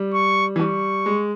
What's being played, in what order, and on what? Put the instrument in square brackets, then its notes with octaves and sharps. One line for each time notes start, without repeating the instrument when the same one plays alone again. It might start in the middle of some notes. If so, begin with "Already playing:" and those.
Already playing: [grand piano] G3
[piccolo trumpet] C#6
[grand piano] E3
[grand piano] G3 [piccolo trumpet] C#6
[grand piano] G#3